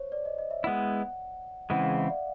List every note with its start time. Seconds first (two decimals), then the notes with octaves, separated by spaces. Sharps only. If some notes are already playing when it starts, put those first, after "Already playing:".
Already playing: C5 C#5
0.12 D5
0.25 D#5
0.38 D#5
0.51 E5
0.64 G#3 B3 E4 F#5
1.70 C#3 E3 G#3 C4 E4 F#5
1.83 F5
1.97 E5
2.10 D5